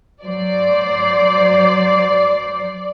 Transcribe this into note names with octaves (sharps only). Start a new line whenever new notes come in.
F#3 C5 D5